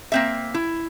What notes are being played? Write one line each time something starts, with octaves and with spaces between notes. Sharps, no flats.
A#3 C4 E5
E4